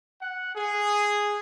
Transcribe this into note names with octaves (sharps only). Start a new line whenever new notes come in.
F#5
G#4